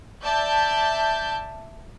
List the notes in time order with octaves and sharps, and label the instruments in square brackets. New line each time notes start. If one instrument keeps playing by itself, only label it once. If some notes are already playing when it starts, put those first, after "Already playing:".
[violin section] D5 E5 A5 G6